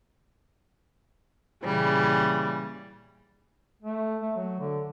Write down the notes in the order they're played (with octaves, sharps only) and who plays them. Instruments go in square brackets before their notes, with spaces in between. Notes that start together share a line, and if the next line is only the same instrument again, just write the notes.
[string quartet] A#2 C#3 E3 G3
[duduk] A3
A3
F#3
D3